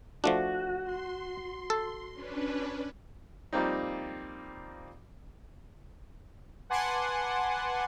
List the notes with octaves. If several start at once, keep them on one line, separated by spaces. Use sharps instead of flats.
F3 A3 D4 F#4
C6
A4
C#4 D4 B4
F3 G3 A#3 C4 D#4
B4 F#5 G#5 A5 C6 D6